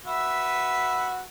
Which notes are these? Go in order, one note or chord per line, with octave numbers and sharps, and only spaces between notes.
F#4 B4 E5